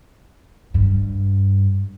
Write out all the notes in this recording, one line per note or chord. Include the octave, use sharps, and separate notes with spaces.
G2